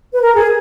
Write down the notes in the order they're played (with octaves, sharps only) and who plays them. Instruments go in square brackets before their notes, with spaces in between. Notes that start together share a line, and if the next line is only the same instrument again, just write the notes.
[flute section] B4
A#4
G#4